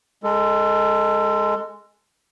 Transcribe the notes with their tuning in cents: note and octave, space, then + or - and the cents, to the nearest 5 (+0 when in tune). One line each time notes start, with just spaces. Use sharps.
G#3 +0 A4 +25